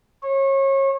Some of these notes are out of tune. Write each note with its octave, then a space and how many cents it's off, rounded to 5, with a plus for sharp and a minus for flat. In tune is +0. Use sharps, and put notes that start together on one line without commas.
C#5 -30